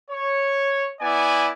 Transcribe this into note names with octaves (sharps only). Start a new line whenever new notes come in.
C#5
B3 E4 D5 G#5